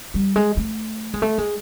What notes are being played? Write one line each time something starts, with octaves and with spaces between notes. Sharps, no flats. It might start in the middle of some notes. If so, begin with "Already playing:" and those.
G3
G#3
A3
G#3
A3
G#3